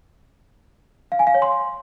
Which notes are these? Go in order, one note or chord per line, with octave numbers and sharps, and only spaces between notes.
F5
G#5
F5
C#5
C6